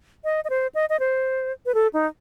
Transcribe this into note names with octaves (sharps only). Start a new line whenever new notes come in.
D#5
D#5
C5
D#5
D#5
C5
B4
A4
D#4